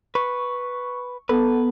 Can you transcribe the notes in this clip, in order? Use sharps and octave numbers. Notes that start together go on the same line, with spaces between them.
B4 C#6
B3 A4 B4 A5